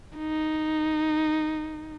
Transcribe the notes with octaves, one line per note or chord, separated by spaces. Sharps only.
D#4